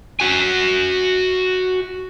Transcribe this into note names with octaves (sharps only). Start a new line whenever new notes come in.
F#4 G#5